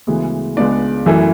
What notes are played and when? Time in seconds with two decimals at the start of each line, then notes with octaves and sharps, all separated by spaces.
0.07 D2 C#3 E3 G#3 B3
0.57 C#2 C#3 G#3 B3 D4 D5
1.06 F#2 E3 A3 E4